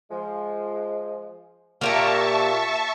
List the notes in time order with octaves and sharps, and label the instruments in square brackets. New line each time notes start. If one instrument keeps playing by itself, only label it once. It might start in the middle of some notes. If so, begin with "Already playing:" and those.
[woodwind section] F3 G#3
[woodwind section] A#2 [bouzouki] A#3 G4 A#4 [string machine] E5 A5 C#6